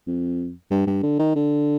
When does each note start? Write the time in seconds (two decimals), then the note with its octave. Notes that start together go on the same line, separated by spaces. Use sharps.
0.07 F2
0.71 G2
0.87 G2
1.03 D3
1.19 D#3
1.36 D3